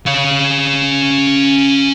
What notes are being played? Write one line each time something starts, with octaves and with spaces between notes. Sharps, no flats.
C#4 F5